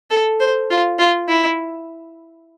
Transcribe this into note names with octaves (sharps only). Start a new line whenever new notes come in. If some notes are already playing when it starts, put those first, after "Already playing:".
A4
C5
F4
F4
E4